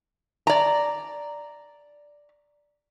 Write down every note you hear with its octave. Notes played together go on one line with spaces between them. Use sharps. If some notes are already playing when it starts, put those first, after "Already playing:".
D5 A#5